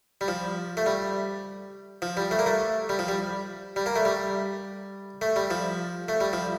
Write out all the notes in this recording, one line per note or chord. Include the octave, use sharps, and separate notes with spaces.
G3
F3
A3
G3
F3
G3
A3
A#3
A3
G3
F3
G3
G3
A#3
A3
G3
A3
G3
F3
A3
G3
F3